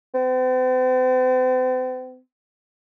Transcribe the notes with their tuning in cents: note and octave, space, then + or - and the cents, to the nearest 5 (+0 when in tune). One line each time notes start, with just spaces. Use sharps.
C4 -45